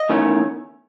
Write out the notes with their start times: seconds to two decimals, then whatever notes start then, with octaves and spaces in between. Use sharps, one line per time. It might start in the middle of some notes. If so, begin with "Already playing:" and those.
Already playing: D#5
0.09 E2 D#3 A3 C#4